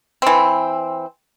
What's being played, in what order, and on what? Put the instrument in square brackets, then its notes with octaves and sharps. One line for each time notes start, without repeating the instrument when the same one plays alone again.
[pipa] E3 C4